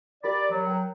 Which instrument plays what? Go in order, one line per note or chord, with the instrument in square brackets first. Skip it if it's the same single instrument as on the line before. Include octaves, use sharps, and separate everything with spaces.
[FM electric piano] G4 A#4 B5 [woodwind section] D5
[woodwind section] F#3
[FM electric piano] A#4 G5